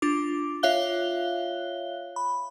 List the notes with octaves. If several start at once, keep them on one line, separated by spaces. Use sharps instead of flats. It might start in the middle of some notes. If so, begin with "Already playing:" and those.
D4 F4 D6
F4 C#5 E5 F5 F#6 G7
B5